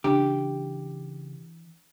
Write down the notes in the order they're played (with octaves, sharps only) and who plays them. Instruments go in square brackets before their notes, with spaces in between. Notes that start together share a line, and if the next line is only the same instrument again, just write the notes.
[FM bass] C#3 [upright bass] E3 [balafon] D4 [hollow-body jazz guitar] G4